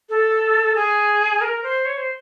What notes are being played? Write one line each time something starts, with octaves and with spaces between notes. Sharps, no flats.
A4
G#4
A#4
C5
C#5
C5